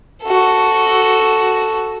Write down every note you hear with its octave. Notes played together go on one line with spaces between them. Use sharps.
F#4 A4